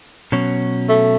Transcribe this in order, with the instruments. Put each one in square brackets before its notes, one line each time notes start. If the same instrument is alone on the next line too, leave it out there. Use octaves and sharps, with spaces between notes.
[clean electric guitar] B2 F#3 C#4
[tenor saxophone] A3